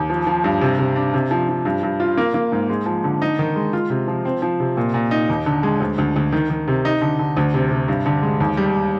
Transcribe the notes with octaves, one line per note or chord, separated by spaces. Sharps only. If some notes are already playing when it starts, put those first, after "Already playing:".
Already playing: D#2
F3
F3
G2
C3
C3
D4
C3
F3
F3
G2
G2
F4
A#3
A#3
G#2
G#3
F3
D3
D#4
D#3
G#3
F4
C3
F3
C4
F3
C3
A#2
A#2
D#4
D#2
D3
G#3
D2
D2
D2
D#3
D#3
C3
D#4
D3
D3
D2
C3
C3
G2
D3
G#3
D#2
G3